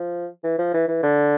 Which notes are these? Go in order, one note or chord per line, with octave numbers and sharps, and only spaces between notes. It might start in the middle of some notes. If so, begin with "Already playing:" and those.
Already playing: F3
E3
F3
E3
E3
D3